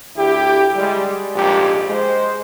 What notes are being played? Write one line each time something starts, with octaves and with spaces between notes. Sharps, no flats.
D2 E4 G4
G3 G#3
A#1 F2 G#2 G4
G#3 C5